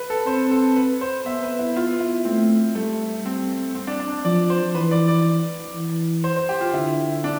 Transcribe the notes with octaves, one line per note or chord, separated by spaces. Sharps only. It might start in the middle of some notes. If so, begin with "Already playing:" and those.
Already playing: B4
A4
C4 C5
A4
B4
C5
B3 E5
B4
E4
F4
E4
A3 C4
G3 A3
C4
C4
D4
D4
F3 D5
C5
E3 B4
D5
D5
E3
C5
C5
G4
F4
D3 E4
D4